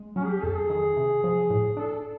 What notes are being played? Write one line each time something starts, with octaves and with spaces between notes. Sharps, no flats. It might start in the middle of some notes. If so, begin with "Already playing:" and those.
Already playing: G#3
F#3 C#4
G#4
G4
F2 A4
G#4
D#3 G#4
C3
F3 G#4
A2
D4 A4